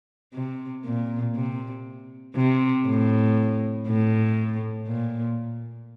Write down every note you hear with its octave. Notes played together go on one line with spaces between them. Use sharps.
C3
A#2
C3
C3
A2
A2
A#2